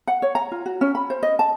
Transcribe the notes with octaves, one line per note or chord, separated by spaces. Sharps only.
F#5
C#5
A#5
F4
F#4
C#4
B5
C5
D#5
A5